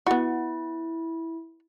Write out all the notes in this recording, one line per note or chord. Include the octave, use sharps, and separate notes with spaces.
B3 E4 F#4